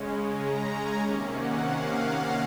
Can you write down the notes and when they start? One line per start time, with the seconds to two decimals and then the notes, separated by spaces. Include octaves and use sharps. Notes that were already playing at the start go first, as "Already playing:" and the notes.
Already playing: C#3 G#3 C#4
0.33 A#5
0.66 G#5
0.97 C3 D#3 A#3 C#4
1.30 F#5
1.62 F5
1.95 F5